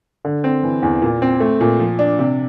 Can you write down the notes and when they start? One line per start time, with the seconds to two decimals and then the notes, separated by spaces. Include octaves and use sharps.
0.25 D3
0.44 C4
0.63 E3
0.83 E2
1.02 A#2
1.22 C4
1.40 A3
1.61 A#2
1.80 F3
1.99 D4
2.19 C3